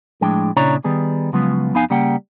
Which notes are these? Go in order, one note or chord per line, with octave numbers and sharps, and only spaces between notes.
A2 F3 G#3 D4 G5
A#2 C#3 D4 E4 C#5 A#5
D#3 G3 B3 G#4
C#3 F3 F#3 G#3 B3 F4
F2 B3 D#4 F5 G#5
C#3 G3 A#3 F#5 G5